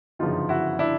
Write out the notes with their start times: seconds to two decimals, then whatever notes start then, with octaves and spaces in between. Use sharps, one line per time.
0.19 G1 F#2 C#3 F3 D#4 F4
0.49 E4 F#4
0.79 D4 E4